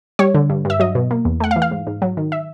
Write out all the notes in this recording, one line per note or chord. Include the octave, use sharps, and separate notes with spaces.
G3 C#5
D3
G2
G2 E5
F#3 D#5
B2
A#3
E2
A3 F#5
F5
E3
F5
G#2
G#2
F#3
D#3
E5